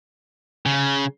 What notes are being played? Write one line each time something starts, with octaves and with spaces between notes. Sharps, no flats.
C#3